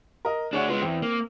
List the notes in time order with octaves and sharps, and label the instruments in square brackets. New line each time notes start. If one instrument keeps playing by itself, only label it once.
[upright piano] A#4 D#5
[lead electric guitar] D2 D4 [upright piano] G#4 C#5 F#5
[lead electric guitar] G#3 F4 [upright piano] B3
[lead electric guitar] E2 [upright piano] C4
[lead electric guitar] A#3